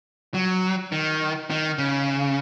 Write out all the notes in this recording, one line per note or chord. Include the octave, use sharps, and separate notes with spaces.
F#3
D#3
D#3
C#3